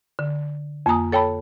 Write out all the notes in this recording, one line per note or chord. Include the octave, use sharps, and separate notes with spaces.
D3
F2 A#3 G#5 A#5 D#6
A4 C#5 G5 A5 B5